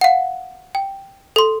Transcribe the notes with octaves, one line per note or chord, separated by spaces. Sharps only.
F5 F#5
G5
A4 C6